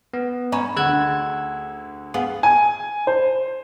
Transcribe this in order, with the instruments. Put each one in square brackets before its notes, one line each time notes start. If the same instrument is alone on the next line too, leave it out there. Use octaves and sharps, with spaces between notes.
[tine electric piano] B3
[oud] C#4 [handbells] D#5 A#5 B5
[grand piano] D2 D3 [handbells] G#4 F#5 [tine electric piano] E6 F#6 G#6
[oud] B3 [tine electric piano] G#4 [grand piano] F5
[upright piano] G#5
C5